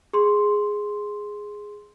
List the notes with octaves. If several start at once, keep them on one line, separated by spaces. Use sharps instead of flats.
G#4 C6